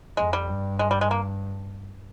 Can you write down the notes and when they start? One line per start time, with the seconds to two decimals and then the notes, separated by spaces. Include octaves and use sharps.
0.17 F2 G#3
0.33 G3
0.49 G2
0.79 G#3
0.91 G3
1.01 G#3
1.11 A#3